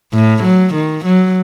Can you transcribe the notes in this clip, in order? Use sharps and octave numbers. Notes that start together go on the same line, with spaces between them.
A2
F#3
D#3
F#3